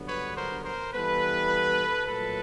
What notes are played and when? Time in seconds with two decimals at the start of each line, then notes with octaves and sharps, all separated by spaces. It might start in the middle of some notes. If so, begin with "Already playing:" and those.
Already playing: G2 D3 F#3 B3
0.08 B4 C#5
0.37 A#4 C5
0.65 A#4 C5
0.93 E3 G3 B3 A4 B4
2.06 A#2 F#3 A3 A4 B4